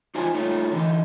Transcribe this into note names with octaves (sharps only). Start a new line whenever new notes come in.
D#4 F4 C5 G#5
A3 D#4 F4 C#5
D3 E3 D#4